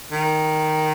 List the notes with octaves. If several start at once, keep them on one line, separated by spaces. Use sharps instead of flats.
D#3